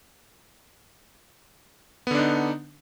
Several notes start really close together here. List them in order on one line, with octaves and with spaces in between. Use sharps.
B3 D3 D4 D#4